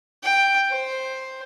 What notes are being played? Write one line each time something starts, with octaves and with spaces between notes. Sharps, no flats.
G5
C5